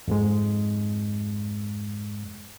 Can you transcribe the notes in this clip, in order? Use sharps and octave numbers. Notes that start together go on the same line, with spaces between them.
F2 G#2 G#3